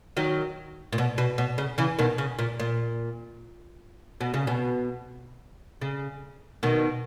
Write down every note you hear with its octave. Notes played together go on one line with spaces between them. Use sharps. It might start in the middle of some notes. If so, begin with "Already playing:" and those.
D#3 F#3
A#2
B2
B2
B2
C#3
C#3 E3
B2 D#3
C#3
A#2
A#2
B2
C#3
B2
C#3
B2 D#3